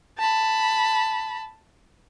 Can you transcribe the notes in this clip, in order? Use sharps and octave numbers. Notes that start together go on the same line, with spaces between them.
A5 B5